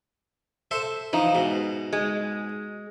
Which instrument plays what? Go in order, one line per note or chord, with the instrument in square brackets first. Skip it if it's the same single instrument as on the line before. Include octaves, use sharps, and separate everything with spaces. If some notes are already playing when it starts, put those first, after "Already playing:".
[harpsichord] A4 C5 E5
[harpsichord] E3 F3 [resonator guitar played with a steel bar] D#4
[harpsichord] G#2 B2
[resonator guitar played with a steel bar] G#3